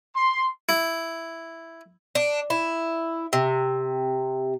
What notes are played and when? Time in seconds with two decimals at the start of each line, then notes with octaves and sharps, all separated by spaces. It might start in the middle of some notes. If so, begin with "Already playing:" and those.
0.15 C6
0.69 E4
2.15 D4
2.50 E4
3.33 C3